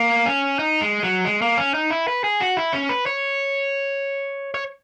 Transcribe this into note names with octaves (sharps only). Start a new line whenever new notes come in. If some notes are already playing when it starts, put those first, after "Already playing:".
Already playing: A#3
C#4
D#4
G#3
F#3
G#3
A#3
C#4
D#4
E4
B4
G#4
F#4
E4
C#4
B4
C#5
C#5